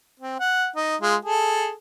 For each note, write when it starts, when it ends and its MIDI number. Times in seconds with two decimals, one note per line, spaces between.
0.20 0.38 60
0.40 0.69 78
0.76 0.96 63
1.01 1.16 56
1.01 1.16 65
1.25 1.72 68
1.25 1.72 69